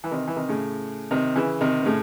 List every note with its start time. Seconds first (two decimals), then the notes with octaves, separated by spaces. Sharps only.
0.04 E3
0.11 C3 D#3
0.27 E3
0.36 C3 D#3
0.49 A2 C#3
1.11 C3 D#3
1.36 C#3 E3
1.61 C3 D#3
1.82 C3
1.85 A2 C#3